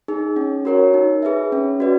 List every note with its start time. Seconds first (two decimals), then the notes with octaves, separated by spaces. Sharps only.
0.08 D#4 G#4
0.36 C#4
0.65 F#4 A#4 C#5
0.94 D#4
1.22 G#4 B4 E5
1.52 C#4
1.80 F#4 B4 D5